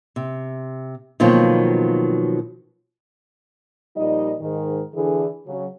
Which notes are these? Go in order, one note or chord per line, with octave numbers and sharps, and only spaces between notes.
C3
B2 D#3 F3 F#3 A#3 C4
A#2 F3 G3 D#4 D#5
G#2 D#3
D3 E3 G#4
C#3 F#3